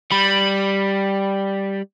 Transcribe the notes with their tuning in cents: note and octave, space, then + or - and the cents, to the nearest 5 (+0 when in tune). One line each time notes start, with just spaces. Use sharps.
G3 +0 B5 +0